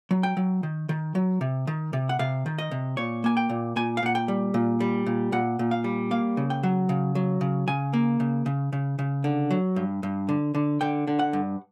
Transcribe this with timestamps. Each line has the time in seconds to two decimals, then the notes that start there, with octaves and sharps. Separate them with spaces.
0.11 F#3
0.23 G5
0.37 F#3
0.63 D#3
0.89 D#3
1.15 F#3
1.41 C3
1.67 D#3
1.93 C3
2.09 F#5
2.19 C3 F5
2.46 D#3
2.59 D#5
2.71 C3
2.97 A#2 C#5
3.24 A#3 G#5
3.37 G5
3.50 A#2
3.76 A#2 G#5
3.97 F5
4.03 A#2 F#5
4.15 G5
4.28 G3
4.54 A#2
4.80 G3
5.06 A#2
5.32 A#2 F#5
5.59 A#2
5.71 F5
5.84 G3
6.11 A#3 F5
6.37 C#3
6.50 G5
6.63 F#3
6.89 C#3
7.15 F#3
7.41 C#3
7.68 C#3 G#5
7.94 A#3
8.20 C#3
8.46 C#3
8.73 C#3
8.99 C#3
9.24 D3
9.51 F#3
9.76 G2
10.03 G2
10.29 D3
10.55 D3
10.81 D3 G5
11.07 D3
11.19 F#5
11.33 G2